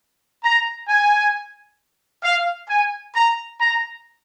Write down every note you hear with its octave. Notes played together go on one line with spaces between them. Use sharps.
A#5
G#5
F5
G#5
A#5
A#5